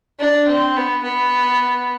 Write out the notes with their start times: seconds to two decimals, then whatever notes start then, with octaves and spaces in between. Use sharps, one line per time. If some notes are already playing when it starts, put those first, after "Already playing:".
0.19 D4
0.48 C4
0.77 B3
1.04 B3